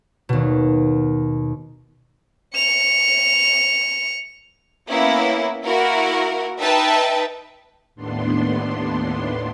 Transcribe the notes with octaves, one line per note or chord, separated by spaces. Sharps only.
D#2 B2
C#7 F7
A#3 B3 C#4 E4
A#3 E4 F#4 A#4
D#4 B4 E5 G5 A5
D#2 A2 B3 D4 C6